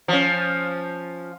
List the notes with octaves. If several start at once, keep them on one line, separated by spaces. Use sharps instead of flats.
F3 C#4